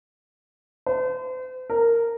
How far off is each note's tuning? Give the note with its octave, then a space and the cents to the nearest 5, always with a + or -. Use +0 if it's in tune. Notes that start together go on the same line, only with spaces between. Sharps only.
C5 -40
A#4 -10